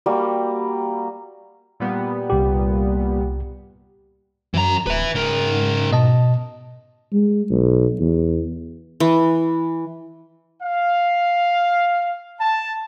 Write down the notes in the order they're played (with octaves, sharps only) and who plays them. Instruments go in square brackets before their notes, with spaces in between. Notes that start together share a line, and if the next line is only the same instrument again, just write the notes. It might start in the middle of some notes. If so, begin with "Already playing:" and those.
[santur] G3 A#3 F#4
[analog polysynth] A#2 G3 B3
[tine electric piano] C2 G4
[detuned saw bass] F#2 [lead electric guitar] E3 A#5
[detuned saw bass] D1 [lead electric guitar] B4 E5
[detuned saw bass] G#2 [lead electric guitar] C#3 A#4
[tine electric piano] B2 D#5 A5
[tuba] G#3
B1
E2
[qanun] E3
[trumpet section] F5
A5